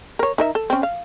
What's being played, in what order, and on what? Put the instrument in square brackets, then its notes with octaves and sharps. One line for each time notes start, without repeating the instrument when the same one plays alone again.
[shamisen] A#4 C#5
D#4 A#4 E5
A4
C4 C#4
F5